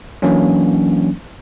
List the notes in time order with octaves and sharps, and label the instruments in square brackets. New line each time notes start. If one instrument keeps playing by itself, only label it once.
[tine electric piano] E3 F#3 A#3 C#4 D4